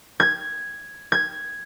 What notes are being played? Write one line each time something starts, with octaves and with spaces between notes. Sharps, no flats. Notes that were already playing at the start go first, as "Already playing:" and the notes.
G#6
G#6